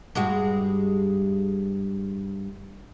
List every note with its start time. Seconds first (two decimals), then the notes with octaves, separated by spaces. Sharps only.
0.15 G2 G#3 F#4